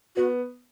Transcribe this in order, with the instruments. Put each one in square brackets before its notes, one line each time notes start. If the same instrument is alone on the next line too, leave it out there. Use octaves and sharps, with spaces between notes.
[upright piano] B3 [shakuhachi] F#4